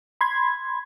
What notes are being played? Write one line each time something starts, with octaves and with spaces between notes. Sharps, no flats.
B5 C6 G#6